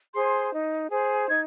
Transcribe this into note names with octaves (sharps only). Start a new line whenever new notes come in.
G#4 C5 C6
D#4
G#4 C5
D#4 G#6